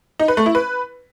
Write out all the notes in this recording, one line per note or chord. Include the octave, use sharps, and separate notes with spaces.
D#4
B4
A3
E4
B4